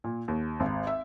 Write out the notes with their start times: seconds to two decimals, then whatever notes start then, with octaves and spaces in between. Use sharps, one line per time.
0.04 A#2
0.28 D#2
0.60 G#1
0.87 E5